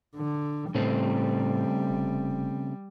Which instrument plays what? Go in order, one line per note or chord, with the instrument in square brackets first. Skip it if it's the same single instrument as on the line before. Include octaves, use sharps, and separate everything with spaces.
[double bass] D3
[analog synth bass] A2 [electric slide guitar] C#3 A3 C4 [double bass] G3
[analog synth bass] F1